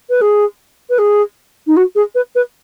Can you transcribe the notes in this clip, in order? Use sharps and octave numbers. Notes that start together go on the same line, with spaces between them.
B4
G#4
B4
G#4
D#4
F#4
G#4
B4
B4